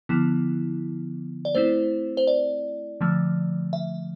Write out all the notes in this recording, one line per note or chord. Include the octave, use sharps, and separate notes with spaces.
D3 F3 B3 E4
D5
A3 C4 E4 C5
C5
D5
D3 F3 A3
E5